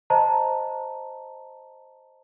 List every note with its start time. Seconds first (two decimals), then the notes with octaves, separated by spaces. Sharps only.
0.10 C5 D#5 A5 A#5